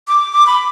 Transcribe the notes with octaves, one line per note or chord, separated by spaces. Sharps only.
D6
D6
B5